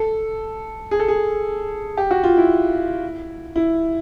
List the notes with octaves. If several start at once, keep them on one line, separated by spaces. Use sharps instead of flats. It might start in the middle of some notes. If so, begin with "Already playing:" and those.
Already playing: A4
G#4
A4
G#4
G4
F#4
F4
E4
E4